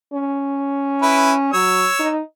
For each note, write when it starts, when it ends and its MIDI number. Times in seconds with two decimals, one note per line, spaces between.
0.13 1.49 61
1.02 1.33 64
1.02 1.33 71
1.53 1.86 54
1.53 2.10 73
1.53 2.10 88
1.99 2.20 63